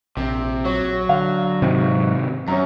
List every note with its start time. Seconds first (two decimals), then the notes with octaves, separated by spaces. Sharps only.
0.17 A#1 C3
0.65 F#3 C#5
1.09 D3 F5
1.62 G#2 C3 D#3
2.48 F#2 F#3 C#5 A#5